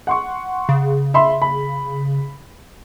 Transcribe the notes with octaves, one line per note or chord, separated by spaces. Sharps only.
F#5 C6 C#6
C#3
E5 B5 C6
B5